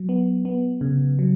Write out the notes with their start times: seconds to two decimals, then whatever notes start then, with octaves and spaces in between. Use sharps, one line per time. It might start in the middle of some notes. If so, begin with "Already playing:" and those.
Already playing: F#3
0.09 B3
0.45 B3
0.81 C#3
1.19 F#3